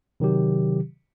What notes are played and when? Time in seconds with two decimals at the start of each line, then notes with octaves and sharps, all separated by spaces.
0.20 C3 D#3 F#3 G4